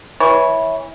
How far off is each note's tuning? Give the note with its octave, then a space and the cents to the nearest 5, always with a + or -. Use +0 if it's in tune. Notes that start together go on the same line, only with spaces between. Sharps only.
E3 -15 C#5 +0